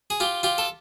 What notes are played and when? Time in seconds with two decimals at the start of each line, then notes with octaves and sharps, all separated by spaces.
0.10 G#4
0.20 F4 G4
0.43 F4 G4
0.58 A4